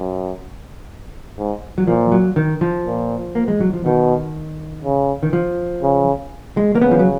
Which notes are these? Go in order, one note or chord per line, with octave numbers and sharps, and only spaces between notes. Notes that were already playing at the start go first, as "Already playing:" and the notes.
Already playing: F#2
G#2
F#3
A#2 F3
F#3
D#3
F3
A#2
A#3
G#3
F#3
F3
B2 D#3
C#3
D#3
F3
C#3
G#3
A#3
C#3 B3
F3
F#3